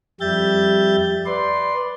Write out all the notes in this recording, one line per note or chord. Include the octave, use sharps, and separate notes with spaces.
F2 G3 G4 E5 G6 A6
B4 D5 C6